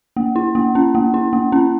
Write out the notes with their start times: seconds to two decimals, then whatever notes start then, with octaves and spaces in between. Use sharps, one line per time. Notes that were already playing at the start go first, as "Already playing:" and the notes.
0.17 A#3
0.36 E4
0.55 A#3
0.75 C#4
0.95 A#3
1.14 E4
1.33 A#3
1.52 C#4